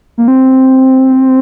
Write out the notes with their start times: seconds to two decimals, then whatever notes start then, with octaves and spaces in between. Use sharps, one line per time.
0.18 A#3
0.28 C4